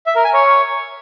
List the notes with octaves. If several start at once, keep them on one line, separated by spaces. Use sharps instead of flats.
E5
A#4
G#5
C#5